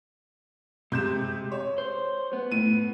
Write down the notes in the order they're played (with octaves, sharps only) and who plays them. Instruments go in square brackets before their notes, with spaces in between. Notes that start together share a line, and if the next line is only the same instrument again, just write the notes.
[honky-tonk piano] C3 G6 E7 [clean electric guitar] G#3
[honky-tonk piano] C#5
[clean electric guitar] C5
B3
[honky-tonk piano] A2 D#7